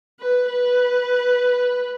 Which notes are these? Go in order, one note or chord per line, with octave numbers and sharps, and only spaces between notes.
B4
B4